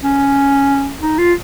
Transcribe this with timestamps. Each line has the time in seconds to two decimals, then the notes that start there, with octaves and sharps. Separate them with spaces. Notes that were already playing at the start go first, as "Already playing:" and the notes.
0.03 C#4
1.02 D#4
1.18 F4